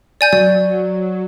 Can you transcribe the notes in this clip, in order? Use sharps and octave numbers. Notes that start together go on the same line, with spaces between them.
D5 G#5 G6
F#3 D5